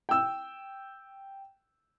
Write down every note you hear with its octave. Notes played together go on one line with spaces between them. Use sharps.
G5 E6